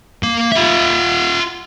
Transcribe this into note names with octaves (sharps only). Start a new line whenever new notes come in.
A#3
F4 E5